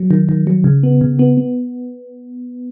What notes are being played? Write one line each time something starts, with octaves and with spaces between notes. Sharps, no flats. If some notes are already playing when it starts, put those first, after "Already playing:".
Already playing: F#3
D#3
D#3
F#3
C#3
B3
C#3
B3
B3